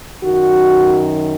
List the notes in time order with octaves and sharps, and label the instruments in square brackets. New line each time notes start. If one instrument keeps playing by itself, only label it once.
[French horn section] F#2 D#3 F#4